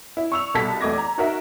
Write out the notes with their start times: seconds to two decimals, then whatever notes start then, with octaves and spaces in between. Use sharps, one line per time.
0.17 E4
0.32 C#6 E6 F7
0.54 C2 B2 A4 A5 B6
0.81 E2 A3 D#5 D6 G#6 A#6
0.98 A#5
1.18 D#4 F#4 A#4 E5